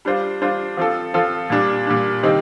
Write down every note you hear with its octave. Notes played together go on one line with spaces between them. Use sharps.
G3 D4 F4 C5
G3 D4 F4 C5
F3 C4 F4 A4
F3 C4 F4 A4
A#2 G3 D4
A#2 G3 D4
C3 D#3 G3 C4 D#4